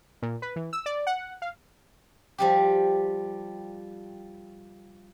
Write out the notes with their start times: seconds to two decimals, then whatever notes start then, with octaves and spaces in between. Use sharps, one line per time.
0.22 A#2
0.42 B4
0.56 E3
0.73 E6
0.86 D5
1.07 F#5
1.42 F5
2.38 F3 G3 G4